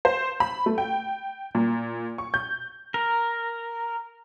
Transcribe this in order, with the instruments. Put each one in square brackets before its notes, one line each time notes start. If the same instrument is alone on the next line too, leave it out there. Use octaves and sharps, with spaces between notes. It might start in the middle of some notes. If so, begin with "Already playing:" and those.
[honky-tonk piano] C5
B5
A3
G5
A#2
C#6
G6
[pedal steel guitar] A#4